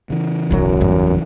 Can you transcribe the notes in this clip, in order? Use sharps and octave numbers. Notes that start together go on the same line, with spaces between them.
C#3 E3
D1 B1 F#2 F#3
G1 E2 G2